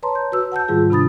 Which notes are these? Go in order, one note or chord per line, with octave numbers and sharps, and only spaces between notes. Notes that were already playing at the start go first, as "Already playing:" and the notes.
B4 C#5 A5 A#5 C6
G6
F#4 B4 E6
F#5 A5 E6 G6
G#2 D#3 G3 F4 G#4
C3 D4 B5 D#6 A6